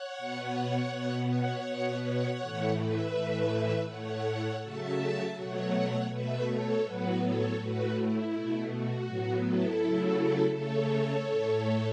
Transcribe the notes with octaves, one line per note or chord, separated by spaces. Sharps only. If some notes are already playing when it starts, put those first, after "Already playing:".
Already playing: C#5 F#5
B2 B3
B2 B3
C#5 F#5
B2 B3
C#5 F#5
A2 E3 A3
B4 E5
A2 E3 A3
A2 A3 C#5 F#5
C#3 F#3 A3 E5 A5
B2 F#3 A3 C#5 F#5
B2 A3 B4 E5
A4 C#5
A2 F#3 B3 F#4 B4
A4 C#5
A2 A3 F#4 B4
E4
B2 A3
F#4
A2 F#3 B3
E4 A4
C#3 F#3 A3
C#3 A3 A4 C#5
A2 A3